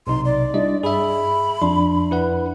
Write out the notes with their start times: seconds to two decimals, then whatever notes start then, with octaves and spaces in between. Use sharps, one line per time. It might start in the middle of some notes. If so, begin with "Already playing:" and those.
0.07 B1 C3 D#4 C6
0.25 D5
0.54 G3 D4 E4 D#5
0.83 G2 G#4 E5 B5
1.62 F2 D4 C6
2.11 E4 B4 F#5